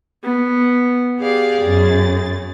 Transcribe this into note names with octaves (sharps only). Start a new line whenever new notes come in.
B3
G4 G#4 D5 F5
F#2 A6